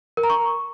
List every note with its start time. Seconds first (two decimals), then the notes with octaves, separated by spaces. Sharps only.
0.17 A#4
0.23 A#5
0.30 C#6